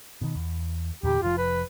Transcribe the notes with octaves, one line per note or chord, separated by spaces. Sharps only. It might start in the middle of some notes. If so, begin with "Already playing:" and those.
B2 D#3
E2
E2 A#2 D3 G4
F1 G#2 F3 F4
B4